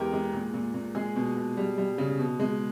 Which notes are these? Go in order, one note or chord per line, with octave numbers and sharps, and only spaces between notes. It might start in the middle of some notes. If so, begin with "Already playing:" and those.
Already playing: E2 G#3 G4 A#4
G#3
A#2
A#2
A#2
G#3 G#4
B2
B2
G3
G3
C#3
B2
G#3